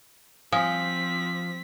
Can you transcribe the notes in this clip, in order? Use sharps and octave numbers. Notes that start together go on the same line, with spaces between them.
F3 C4 F5 G#5 D#6 B6